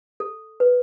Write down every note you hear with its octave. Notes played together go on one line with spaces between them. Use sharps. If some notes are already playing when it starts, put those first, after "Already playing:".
A4
B4